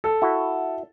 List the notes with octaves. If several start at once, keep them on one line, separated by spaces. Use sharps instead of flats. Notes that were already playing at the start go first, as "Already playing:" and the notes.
A4
E4 F#4